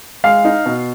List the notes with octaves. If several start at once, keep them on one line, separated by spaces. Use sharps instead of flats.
G#3 F5
D#4
B2